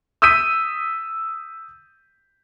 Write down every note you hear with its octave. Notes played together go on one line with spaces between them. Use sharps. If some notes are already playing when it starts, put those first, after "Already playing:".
D#6 E6 G6 B6 D#7